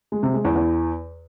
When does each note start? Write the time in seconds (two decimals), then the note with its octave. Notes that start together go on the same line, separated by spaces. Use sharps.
0.12 G#3
0.23 C3
0.34 G#3
0.45 E2
0.55 E2